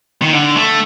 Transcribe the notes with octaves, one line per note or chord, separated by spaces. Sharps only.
D#3
D3
A3